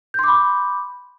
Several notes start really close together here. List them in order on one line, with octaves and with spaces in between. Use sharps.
G6 C6 D6 B5